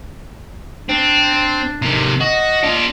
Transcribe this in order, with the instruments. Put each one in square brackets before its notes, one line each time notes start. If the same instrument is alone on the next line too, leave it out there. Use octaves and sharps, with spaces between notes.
[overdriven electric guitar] C4 [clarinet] D4
[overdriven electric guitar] C3 D#3
[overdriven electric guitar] F#4 [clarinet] D#5
[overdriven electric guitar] D4 F4